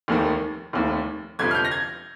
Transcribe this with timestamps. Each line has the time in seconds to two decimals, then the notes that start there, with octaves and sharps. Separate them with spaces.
0.08 F1 D#2 D#3
0.73 F1 D#2 D#3
1.39 G1 F2 C3 F3 G#6
1.51 F6
1.55 G6
1.65 A#6
1.71 G#6